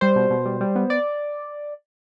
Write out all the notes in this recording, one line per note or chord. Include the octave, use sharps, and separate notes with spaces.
G3 C5
B2
B2
G3
G3
B3
D5